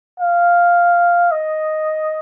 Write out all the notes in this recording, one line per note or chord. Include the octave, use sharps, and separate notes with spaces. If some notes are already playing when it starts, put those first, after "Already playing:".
F5
D#5